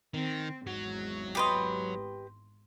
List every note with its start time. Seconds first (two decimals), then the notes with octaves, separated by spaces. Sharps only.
0.14 D#3 C4
0.67 G#1 E2 G#2 F#3
1.35 G4 B4 D#5 C6 G6 A6